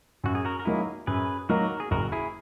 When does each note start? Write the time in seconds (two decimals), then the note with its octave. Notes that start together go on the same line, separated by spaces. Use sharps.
0.24 F#2 F#4
0.35 G#4
0.45 F#4 A#4
0.59 A#4
0.65 D#3 F#3 A#3 D#4 E4 G#4
1.07 F#2 G#4 B4
1.49 D#3 F#3 A#3 D#4 F#4 A#4
1.80 G#4
1.91 F#1 F#4 A#4
2.12 E4 G#4